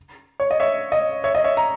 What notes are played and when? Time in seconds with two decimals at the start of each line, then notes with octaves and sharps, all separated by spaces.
0.40 C#5
0.51 D#5
0.60 C#5 E5
0.92 D#5
1.24 C#5 E5
1.35 D#5
1.44 C#5 E5
1.57 A#5